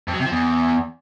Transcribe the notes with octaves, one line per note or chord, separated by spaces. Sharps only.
F2
F#3
C3
F3
E2